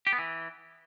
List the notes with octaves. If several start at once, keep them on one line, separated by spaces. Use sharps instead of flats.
G4
B3
E3